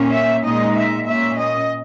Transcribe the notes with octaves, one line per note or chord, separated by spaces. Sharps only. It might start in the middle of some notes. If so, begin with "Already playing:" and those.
Already playing: A#2 A#3 C#4
E5
A#2 G#3 D#4 D#5
E5
A#2 A#3 C#4 E5
D#5